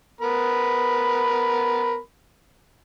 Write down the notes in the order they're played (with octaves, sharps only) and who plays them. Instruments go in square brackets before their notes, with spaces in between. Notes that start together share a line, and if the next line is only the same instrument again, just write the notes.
[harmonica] B3 A#4 B5